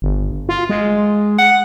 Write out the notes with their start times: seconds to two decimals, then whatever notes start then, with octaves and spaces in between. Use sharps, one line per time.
0.02 G1
0.49 F4
0.69 G#3
1.38 F#5